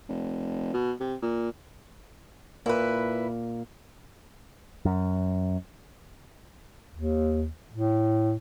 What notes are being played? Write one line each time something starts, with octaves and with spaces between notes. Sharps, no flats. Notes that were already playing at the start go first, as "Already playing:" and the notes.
F1
B2
C3
A#2
A#2 A#3 E4 B4
F#2
D#2
A2